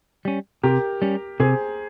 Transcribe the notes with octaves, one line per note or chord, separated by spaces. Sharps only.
G3 C#4
C3 G4 A#4
G3 C#4
C3 G#4 C5